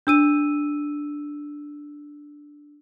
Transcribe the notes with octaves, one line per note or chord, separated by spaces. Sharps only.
D4 E6 D#7